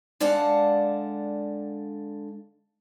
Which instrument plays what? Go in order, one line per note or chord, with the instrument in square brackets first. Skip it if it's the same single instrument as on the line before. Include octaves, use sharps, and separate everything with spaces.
[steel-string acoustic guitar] D3 G#3 D5 F5 F#5 A5